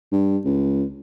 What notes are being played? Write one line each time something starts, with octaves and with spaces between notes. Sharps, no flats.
G2
C#2